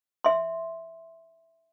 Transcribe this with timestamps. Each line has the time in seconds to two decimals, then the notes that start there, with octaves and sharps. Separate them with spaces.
0.24 E5 C6